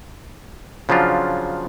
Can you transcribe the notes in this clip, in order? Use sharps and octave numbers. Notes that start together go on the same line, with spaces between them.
C#3 F3 F#3 D4 F4